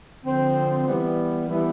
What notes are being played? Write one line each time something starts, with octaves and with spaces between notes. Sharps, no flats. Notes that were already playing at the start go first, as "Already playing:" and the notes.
D3 F3 C4
E3 G3 B3
E3 G3 B3